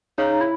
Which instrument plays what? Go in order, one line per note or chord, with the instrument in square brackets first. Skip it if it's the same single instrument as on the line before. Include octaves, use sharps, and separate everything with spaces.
[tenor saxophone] C#3 [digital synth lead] D#4
[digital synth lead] E4